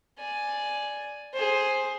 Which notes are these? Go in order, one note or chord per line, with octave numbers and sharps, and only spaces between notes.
D5 G#5
G#4 C5